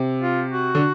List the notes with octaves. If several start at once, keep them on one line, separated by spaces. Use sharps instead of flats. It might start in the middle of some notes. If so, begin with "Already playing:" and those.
Already playing: C3
F4
F#4
D3